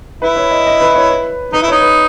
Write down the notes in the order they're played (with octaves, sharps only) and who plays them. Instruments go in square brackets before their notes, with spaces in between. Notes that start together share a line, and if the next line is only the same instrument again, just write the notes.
[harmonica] E4 [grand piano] B4
[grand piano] C#5
D#5
D#5
B4
C#5
B4
[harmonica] D#4 [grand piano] B4
[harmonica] E4
[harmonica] D#4 [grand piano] C#5
[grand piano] B4